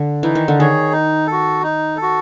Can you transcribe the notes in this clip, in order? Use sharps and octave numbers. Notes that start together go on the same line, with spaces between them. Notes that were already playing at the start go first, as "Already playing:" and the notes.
Already playing: D3
E3 D#4
D#3
D3
D#3 G#4 C#5
D#4
A4
F#4
D#4
A4
F#4